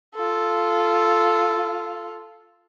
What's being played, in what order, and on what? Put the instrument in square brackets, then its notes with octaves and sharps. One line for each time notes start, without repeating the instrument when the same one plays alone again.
[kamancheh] F4 A4